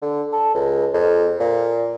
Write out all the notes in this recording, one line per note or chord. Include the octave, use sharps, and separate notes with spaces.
D3
A4
C#2
F2
A#2